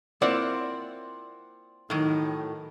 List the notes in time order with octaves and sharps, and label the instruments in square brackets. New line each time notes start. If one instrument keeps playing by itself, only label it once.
[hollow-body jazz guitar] A#3 E4 C5 [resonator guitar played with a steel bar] C4 F4 F#5 [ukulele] D5
[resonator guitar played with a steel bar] A2 F#3 [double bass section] D#3